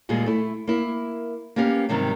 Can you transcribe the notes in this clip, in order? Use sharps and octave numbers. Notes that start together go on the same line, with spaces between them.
D#2 A#2 G3 G#3 G#4
A3 E4
A#3 E4
A#3 B3 C#4 G4 F5
G#2 C3 D#3 F#3 G3